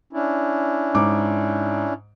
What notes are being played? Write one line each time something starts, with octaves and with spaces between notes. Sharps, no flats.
C#4 D4 E4
G#2 D6